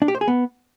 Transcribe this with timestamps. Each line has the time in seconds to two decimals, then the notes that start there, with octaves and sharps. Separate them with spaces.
0.02 D4
0.08 G4
0.15 C5
0.21 G#4
0.28 B3